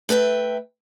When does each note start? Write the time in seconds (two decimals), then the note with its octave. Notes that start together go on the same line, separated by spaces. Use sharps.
0.09 A3 B4 E5 G5